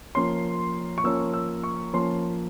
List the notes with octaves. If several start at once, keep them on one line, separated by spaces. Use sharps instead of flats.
F3 A#3 C#4 C6
C#6
F3 A#3 C#4 E6
E6
C#6
F3 A#3 C#4 C6